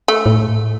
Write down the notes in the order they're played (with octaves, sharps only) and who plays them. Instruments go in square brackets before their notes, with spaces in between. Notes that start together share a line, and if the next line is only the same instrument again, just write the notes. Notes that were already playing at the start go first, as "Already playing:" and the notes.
[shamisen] A3
[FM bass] A2